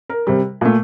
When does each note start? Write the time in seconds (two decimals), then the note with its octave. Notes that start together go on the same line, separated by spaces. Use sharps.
0.09 A#4
0.27 C3 G3
0.61 A#2 A3